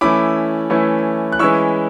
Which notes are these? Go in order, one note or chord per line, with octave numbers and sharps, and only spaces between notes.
E3 A3 C#4 E4 B5 D6
E3 A3 C#4 E4
F#6
E3 G#3 C#4 E4 C#6 E6